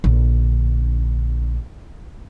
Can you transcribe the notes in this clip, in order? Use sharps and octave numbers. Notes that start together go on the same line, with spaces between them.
A#1 D3